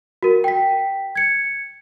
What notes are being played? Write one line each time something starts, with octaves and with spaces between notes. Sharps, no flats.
F#4 A#4
G5 B6
G#6 C#7